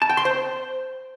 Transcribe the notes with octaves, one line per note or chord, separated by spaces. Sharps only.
A5
G5
C6
C5